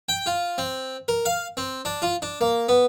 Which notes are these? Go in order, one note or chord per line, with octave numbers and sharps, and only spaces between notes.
G5
F4
C4
A#4
F5
C4
D4
F4
D4
A#3
B3